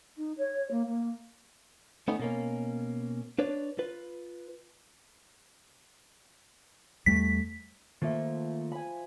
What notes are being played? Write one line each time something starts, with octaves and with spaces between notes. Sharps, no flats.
D#4
C#5
A#3
A#3
A3 B3 C#4 D#4
B2 A#3 C#4
D4 B4 C#5 D5
F4 B4
E2 G3 A3 B6
D#3 F3 A3 A#3 E5
G#5 B5